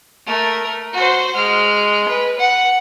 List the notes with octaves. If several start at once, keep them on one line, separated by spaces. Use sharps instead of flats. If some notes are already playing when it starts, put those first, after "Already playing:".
A3 A#4
F#4 C5
G#3 F6
B4
F#5